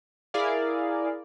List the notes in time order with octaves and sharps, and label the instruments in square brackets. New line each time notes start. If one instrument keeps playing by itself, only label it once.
[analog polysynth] E4 G#4 A#4 D5 F5